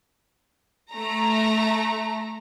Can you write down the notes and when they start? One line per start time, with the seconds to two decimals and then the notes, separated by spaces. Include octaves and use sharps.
0.92 A3 A#5